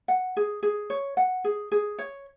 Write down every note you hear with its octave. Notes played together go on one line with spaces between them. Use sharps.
F#5
G#4
G#4
C#5
F#5
G#4
G#4
C#5